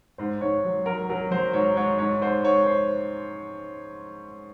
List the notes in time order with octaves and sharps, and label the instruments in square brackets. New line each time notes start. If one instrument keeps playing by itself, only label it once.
[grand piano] G#2 C5
G#2 C#5
F#3
F#3 A#4
F#3 A#4
F#3 C5
G#2 C#5
G#2 C#5
G#2 C#5
G#2 C5
G#2 C#5
C5